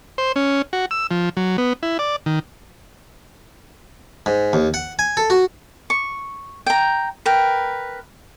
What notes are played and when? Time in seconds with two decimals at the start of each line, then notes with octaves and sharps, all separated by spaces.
0.18 C5
0.36 C#4
0.73 F#4
0.91 E6
1.11 F3
1.37 F#3
1.58 B3
1.83 E4
1.99 D5
2.26 D#3
4.26 G#2
4.53 D#2
4.74 F#5
4.99 G#5
5.17 A4
5.30 F#4
5.90 C#6
6.66 G5 A#5
7.26 A#4 B4 G5